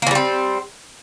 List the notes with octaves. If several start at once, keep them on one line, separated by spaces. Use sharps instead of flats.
E3 G3 A#3 C4